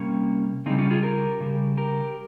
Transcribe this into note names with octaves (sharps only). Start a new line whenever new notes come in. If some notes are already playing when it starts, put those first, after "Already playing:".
Already playing: C3 G3 A#3 C#4
C#3 G3 C4 D#4
C#4 F4
F4 G#4
G4 A#4
C#3 G3
G4 A#4